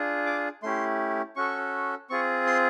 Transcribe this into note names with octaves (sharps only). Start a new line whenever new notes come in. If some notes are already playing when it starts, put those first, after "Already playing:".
Already playing: D4 F4 G#4
D6
A3 C#4 E4 G4 C6
C#4 F#4 A4 C#6
C4 F4 G#4 C#6
C6